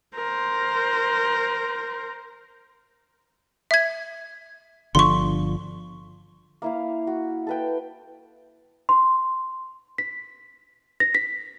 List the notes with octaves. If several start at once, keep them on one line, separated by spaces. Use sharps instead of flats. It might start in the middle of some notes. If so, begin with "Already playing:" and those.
A#4 C5
E5 G#6
G1 D3 F3 C6 C#6
A#3 E4 F5
F#4
A4 B4 G5
C6
B6
A#6
B6